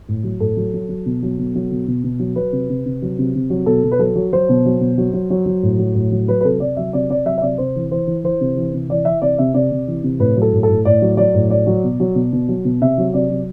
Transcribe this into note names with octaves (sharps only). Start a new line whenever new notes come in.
A2
F#3
A2 A4
F#3
F#3
F#3
B2
F#3
B2
F#3
B2
B2
B2
F#3
F#3 B4
C3
C3
C3
F#3
C3
C3
F#3
B2 A4
B2
B4
F#3 A4
F#3
F#3 C5
B2
F#3
B2
F#3
F#3
F#3
F#3
A2
F#3
A2
F#3
F#3 B4
B4
C3 A4
C3 D5
F#3 E5
C3 D5
C3 D5
F#3 E5
E5
C3 D5
C3 C5
E3
E3 C5
E3
E3 C5
C3
E3
C3
E3 D5
E3 E5
C3 D5
C3 E5
C3 D5
C3
E3
C3
A2 B4
F#3
A4
A2
A4
A2
A2 D5
F#3
F#3 D5
A2
F#3 D5
F#3
B2
F#3
B2
B2
F#3
B2
C3 E5
F#3
C3 D5
F#3